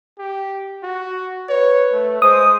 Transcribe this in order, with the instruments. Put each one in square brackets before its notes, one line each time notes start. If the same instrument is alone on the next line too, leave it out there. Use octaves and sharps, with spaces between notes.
[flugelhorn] G4
F#4
[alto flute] B4 [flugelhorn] C#5
[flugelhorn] A3
[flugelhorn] G#3 [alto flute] C5 [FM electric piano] D#6